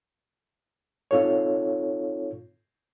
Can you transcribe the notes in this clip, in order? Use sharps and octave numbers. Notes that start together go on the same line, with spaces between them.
C4 D#4 F4 A4 C#5